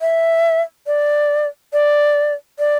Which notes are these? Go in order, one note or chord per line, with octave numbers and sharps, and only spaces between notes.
E5
D5
D5
D5